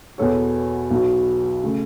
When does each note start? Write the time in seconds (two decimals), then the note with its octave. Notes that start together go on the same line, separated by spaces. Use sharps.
0.18 E2 B2 B3 A4 C#5
0.91 B1 B2 F#3 B3
1.64 C#3 A3